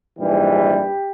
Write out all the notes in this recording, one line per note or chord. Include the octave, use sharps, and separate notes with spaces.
A#1 G#2 E3 G3 G4